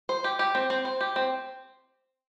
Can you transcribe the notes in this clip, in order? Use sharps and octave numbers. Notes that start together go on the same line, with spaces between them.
C5
G4
G4
C4
C4
C5
G4
C4